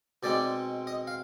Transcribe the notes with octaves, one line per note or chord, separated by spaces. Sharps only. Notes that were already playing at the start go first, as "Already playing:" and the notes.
B2 G#3 C4 D#4 D5
D#5
F5